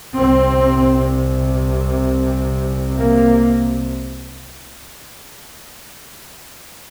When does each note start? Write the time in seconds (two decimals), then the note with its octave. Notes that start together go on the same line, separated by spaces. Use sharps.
0.17 C2 C3 C4
2.98 A#3